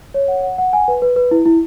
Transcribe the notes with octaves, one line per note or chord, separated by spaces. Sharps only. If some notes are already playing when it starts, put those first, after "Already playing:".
C#5
F#5
F#5
F#5
G#5
B4
B4
B4
E4
E4